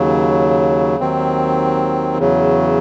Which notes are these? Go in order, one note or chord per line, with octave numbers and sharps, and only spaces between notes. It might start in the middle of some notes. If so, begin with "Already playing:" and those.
Already playing: D#2 C#3 F#3
D#2 D#3 F#3 C4
E2 C#3 F#3